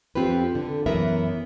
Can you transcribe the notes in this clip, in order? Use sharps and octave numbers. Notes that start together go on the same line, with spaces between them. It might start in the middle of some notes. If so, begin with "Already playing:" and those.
F2 C4 F4 G4 B4
D3
F#2 E3 B3 A#4 E5